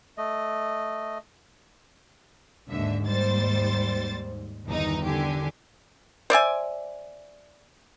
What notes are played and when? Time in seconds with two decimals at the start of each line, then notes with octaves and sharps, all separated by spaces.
0.18 A3 D#5
2.69 D#2 G#2 D3 E5
3.04 G3 C5 A6
4.66 G1 E2 D#3 E3 D#4
5.05 D3 G4 G#5
6.30 C5 D5 E5 G#5